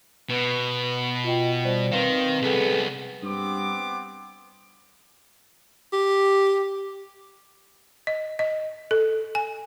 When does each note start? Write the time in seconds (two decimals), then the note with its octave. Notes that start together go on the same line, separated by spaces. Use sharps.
0.29 B2 B4
1.24 F4 D#5 G5
1.64 G3 C5 D5
1.92 D#3 C4 B4 F5
2.42 C2 B3 G#4 A4 B4
3.22 G2 B3 C4 D6
5.93 G4
8.07 D#5
8.39 D#5
8.91 A4
9.35 G#5